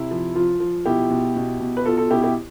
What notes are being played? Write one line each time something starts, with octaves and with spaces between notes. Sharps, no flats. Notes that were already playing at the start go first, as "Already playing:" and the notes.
Already playing: C3 E4
F3
F3 F4
F3
B2 E4 G4
B2
B2
B2
B4
B2 F4 A4
F4 A4
B2 E4 G4
E4 G4